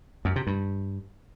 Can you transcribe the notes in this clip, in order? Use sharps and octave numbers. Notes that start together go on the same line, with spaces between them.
F#2
C3
G2